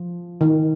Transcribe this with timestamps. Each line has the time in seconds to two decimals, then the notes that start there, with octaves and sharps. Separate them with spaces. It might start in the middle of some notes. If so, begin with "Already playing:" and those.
Already playing: F3
0.41 D#3